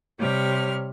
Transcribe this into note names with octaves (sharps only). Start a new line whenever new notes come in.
C3 G3 C#5 F6